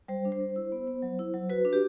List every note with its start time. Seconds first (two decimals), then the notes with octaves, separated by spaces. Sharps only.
0.08 G3 C5
0.25 D4
0.32 C5
0.40 G3
0.56 E4
0.72 B3
0.88 B3
1.02 F#3
1.19 E4
1.34 F#3
1.50 F#4 B4
1.65 D4
1.73 G4